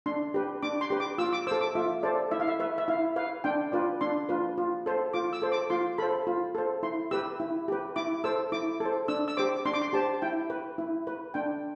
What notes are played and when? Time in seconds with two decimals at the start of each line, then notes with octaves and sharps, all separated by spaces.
0.06 D4 C6
0.34 G4 B4
0.63 D4 D6
0.81 C6
0.90 G4 B4
1.00 D6
1.18 F4 E6
1.33 D6
1.47 A4 C5 E6
1.61 D6
1.75 F4 E5
2.03 A4 C5 D5
2.31 E4 E5
2.40 F5
2.47 E5
2.60 B4 E5
2.78 E5
2.88 E4 F5
3.16 B4 F5
3.44 D4 G5
3.72 F4 B4 D5
4.01 D4 C6
4.29 F4 B4
4.58 F4
4.86 A4 C5
5.13 F4 D6
5.33 E6
5.42 A4 C5
5.52 D6
5.70 F4 C6
5.98 A4 C5 B5
6.27 F4
6.55 A4 C5
6.83 E4 C6
7.11 G4 B4 E6
7.40 E4
7.68 G4 B4
7.96 E4 D6
8.24 A4 C5 E6
8.52 E4 D6
8.80 A4
8.85 C5
9.08 D4 E6
9.28 E6
9.37 G4 C5 D6
9.65 D4 C6
9.74 D6
9.82 C6
9.93 G4 C5 A5
10.22 E4 G5
10.50 B4
10.78 E4
11.07 B4
11.34 D4 G5